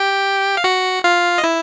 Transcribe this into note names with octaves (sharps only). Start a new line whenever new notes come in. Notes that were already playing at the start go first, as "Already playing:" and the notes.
Already playing: G4 G5
F5
F#4 F#5
F4 F5
D#5
E4 E5